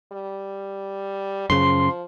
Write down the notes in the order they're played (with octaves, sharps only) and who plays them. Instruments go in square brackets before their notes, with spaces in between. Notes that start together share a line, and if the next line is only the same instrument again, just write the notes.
[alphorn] G3
[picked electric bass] F#2 C#3 [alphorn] F3 [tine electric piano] C6